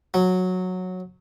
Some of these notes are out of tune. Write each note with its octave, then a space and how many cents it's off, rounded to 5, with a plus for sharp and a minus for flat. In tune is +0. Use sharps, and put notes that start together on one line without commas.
F#3 -10